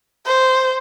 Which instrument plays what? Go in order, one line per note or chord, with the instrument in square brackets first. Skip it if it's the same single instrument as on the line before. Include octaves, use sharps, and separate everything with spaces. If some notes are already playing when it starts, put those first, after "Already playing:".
[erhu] C5